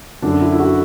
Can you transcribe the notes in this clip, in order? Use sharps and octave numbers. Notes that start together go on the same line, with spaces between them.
F#2 D3 A3 D4
E4
E4
F#4